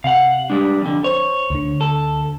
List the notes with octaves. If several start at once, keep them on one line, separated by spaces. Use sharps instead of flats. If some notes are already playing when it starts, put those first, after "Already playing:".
C3 F5 F#5
G3 G#3 D4
F2 D3
C5 C#5
D2 D3
A4